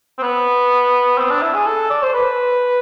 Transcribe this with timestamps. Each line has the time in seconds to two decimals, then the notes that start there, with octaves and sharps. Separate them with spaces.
0.18 C4
0.22 B3
1.18 C4
1.30 D4
1.42 E4
1.54 G#4
1.66 A4
1.90 D5
2.02 C5
2.14 B4